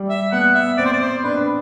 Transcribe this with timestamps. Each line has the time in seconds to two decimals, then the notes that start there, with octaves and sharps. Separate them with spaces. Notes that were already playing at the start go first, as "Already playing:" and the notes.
Already playing: G3
0.09 E5
0.32 B3 F#5
0.54 E5
0.77 C4 D5
0.85 C5
0.92 D5
1.00 C5
1.23 D4 B4